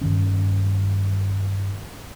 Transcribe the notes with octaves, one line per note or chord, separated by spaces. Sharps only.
G2 D#3 C#4